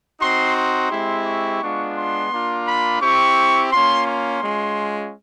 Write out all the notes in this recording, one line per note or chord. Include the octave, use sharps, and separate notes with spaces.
C4 D#4 F#4 C6
C6
G#3 C4 E4 G4
C#6
G#3 B3 D4 F4
C6
A#3 D4 F4
B5
C4 E4 G4 C#6
A#3 C#4 F4 C6
C6
G#3 C#4 F4